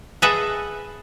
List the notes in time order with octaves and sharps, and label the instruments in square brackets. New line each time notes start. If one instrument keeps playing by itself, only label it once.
[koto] G#4 A4 B4 D#5 E5 F#5